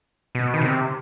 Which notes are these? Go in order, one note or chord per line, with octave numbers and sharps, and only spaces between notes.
B2
D#3
C3